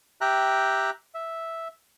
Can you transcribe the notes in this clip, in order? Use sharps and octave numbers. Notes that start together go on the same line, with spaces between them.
G4 E5 G5 A#5 F#6
E5